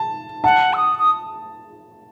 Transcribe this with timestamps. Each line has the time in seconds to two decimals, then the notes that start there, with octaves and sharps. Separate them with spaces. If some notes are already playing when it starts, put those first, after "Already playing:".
Already playing: A5
0.44 F#5 A5
0.73 E6
0.77 D#6
0.99 D#6